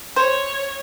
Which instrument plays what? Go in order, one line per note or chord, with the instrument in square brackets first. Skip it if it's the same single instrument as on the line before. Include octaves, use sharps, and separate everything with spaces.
[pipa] C5 [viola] C#5